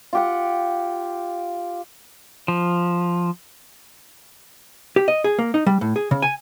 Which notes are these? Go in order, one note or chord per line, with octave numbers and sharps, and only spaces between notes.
F4 G4 F#5
F3
G4
D#5
G#4
A#3
D#4
G3
A2
G#4
C#3
G#5